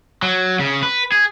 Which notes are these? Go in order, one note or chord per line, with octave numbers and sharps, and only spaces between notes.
F#3
C#3
B4
G#4